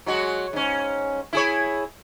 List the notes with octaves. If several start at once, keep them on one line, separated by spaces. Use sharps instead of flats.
F#3 G#3 F#4
G#2 C#4
E4 G#4 C#5